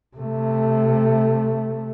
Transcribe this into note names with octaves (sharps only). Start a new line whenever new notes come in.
C3 A3